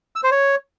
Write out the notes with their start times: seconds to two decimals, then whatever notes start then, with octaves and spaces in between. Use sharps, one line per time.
0.16 E6
0.24 C5
0.31 C#5